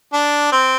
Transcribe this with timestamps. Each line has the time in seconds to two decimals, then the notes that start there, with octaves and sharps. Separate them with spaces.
0.13 D4
0.52 C4